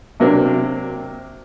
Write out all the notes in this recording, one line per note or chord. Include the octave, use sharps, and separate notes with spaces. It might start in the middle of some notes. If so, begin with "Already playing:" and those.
C3 F#3 A#3 C4 D4